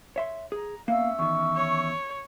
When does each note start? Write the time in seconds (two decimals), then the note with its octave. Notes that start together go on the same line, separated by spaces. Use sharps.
0.16 C#5 E5 C6
0.52 G#4 A#5
0.88 A#3 B3 C#4 E5 F5 E6
1.19 E2 D#3 C#6
1.56 C#5